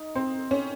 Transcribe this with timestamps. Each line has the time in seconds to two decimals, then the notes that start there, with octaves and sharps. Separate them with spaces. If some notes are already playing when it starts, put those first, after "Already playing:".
Already playing: D#4
0.15 C4
0.51 C#4